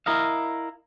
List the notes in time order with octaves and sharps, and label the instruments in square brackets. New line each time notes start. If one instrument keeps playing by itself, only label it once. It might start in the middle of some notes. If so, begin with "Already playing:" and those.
[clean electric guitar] E4 A#4 D#5 F5